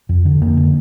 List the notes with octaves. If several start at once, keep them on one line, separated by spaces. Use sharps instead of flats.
F2
D3
F2 A#3
D3